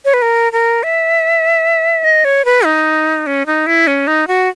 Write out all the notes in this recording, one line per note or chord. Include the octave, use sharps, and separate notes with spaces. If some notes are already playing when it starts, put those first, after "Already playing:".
C#5
B4
A#4
A#4
E5
D#5
C#5
B4
D#4
C#4
D#4
E4
C#4
D#4
F#4